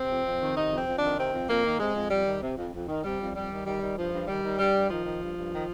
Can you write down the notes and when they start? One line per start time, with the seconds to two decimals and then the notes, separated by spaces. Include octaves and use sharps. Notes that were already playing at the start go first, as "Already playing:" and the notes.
Already playing: C3 C4
0.09 F2
0.25 F2
0.40 D#3
0.56 C3 D#4
0.71 F2
0.77 C4
0.87 F2
0.97 D#3 D4
1.18 C3 C4
1.33 F2
1.49 F2 A#3
1.64 D#3
1.80 C3 G#3
1.95 F2
2.11 F2 G3
2.26 D#3
2.42 C3
2.57 F2
2.73 F2
2.88 D#3
3.04 C3 G3
3.20 F2
3.35 F2 G3
3.50 D#3
3.66 D#3 G3
3.81 D#3
3.97 G2 F3
4.13 G2
4.28 D#3 G3
4.44 D#3
4.59 G2 G3
4.75 G2
4.90 D#3 F3
5.05 D#3
5.21 G2
5.37 G2
5.52 D#3